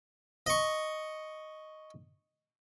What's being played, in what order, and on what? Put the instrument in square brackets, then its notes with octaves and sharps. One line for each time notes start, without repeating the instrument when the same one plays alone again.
[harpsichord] D#5 C#6